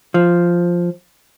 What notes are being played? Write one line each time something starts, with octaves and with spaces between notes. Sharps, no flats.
F3